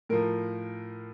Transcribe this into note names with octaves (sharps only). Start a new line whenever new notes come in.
A2 F3 A#4